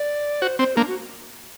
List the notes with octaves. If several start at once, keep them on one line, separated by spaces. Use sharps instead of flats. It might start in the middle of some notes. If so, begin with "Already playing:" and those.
Already playing: D5
F#4 C5
C4 C5
A#3 D4
F#4